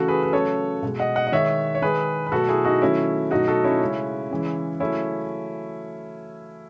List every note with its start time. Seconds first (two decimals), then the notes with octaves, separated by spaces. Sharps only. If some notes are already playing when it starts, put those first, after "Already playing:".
Already playing: C#3 E3 A3 F#4 A4
0.08 G#4 B4
0.23 B4
0.33 C#3 F#3 A3 A4 C#5
0.83 B2 G#3
1.00 D#5 F#5
1.16 D#5 F#5
1.27 D#5
1.32 D#3 G#3 C#5 E5
1.75 C#5
1.82 D#3 G#3 G#4 B4
2.27 B4
2.32 B2 F#3 A3 F#4 A4
2.48 E4 G#4
2.65 D#4 F#4
2.82 D#3 F#3 A3 C#4 E4
3.31 B2 F#3 A3 D#4 F#4
3.48 F#4 A4
3.64 C#4 E4
3.81 C#3 G#3
4.31 C#3 E3 G#3
4.80 C#3 F#3 A3 C#4 E4